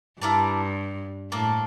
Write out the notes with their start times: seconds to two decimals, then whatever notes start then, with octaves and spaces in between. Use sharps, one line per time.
0.21 G2 E4 A#4 D5 A5
1.32 A2 A#3 D4 A4